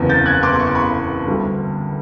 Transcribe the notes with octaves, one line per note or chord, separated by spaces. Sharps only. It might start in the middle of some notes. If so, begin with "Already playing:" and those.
Already playing: F#1 E2 C3
G6 A6
F#6 G#6
C6 D6
C#6
C6
B5 C#6
D2 D3 G3